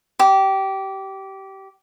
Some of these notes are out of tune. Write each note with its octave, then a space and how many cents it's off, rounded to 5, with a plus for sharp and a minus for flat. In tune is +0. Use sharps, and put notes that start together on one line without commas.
G4 -20